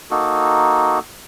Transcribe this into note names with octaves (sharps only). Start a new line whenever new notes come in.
A#3 D#4 F#4 A4